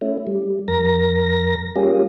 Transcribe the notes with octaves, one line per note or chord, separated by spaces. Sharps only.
A3 C#4 E4
G3
F2 A#4 A#6
G3 A#3 C#4 F4 G4 G#4